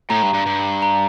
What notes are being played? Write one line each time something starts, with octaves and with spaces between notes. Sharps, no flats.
A2 A#5
G2
G2
G2
A#5